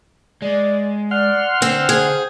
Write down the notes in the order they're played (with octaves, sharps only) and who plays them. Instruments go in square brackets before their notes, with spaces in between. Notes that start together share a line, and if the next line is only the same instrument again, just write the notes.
[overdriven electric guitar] G#3 [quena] D5
[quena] D5 [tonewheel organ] F#5 C6 F6
[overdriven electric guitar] D3 [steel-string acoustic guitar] C4 [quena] E6
[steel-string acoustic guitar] G#4 [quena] C5